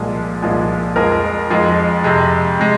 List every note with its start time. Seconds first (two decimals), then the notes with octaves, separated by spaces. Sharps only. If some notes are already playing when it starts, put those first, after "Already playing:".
Already playing: C2 A#2 F3 G#3
0.42 C2 A#2 F3 G#3
0.96 F2 F3 G#3 A#4
1.50 F2 F3 G#3
2.04 F2 C3 G#3
2.59 C3 G#3